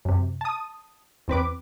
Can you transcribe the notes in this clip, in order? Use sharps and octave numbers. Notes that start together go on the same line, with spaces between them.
F#2 C3
A5 D#6
E2 C4 B4 D6